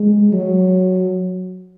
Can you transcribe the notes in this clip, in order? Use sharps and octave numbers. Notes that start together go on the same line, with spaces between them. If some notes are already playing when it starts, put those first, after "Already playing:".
Already playing: G#3
F#3